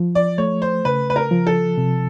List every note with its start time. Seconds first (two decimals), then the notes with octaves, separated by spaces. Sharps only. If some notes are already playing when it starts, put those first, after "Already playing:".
Already playing: F3
0.15 D5
0.38 A3 C#5
0.62 C5
0.85 C#3 B4
1.10 B4
1.16 A#4
1.31 F3
1.47 A4
1.78 C3